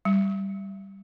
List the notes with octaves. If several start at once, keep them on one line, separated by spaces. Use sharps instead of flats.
G3